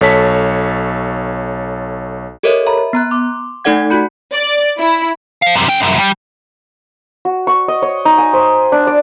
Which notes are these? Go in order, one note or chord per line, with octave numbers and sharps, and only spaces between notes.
B1 A4 C#5 A5 B6
G4 A4 A#4 C#5 D#5 E5
E5 A#5 B5
B3 A#5 F#6
C6 D6
A3 D#4 A4 D5 F#5 G#6
F4 F#4 B5 G6 C#7
D5
E4
C5 F5
F#2 C3
C#4 G5
C2 F#2
G3
F#4
C#6
D#5
C#5
D#4
G#5
C5
D4
D5